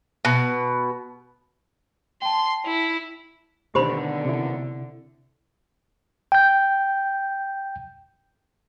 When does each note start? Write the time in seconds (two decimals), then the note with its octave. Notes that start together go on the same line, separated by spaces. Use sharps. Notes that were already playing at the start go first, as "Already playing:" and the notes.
0.25 B2
2.22 G5 A5 C6
2.66 E4
3.75 B2 D3 D#3 B3 G4 C5 B5
4.25 C3 E4
6.32 G5 G6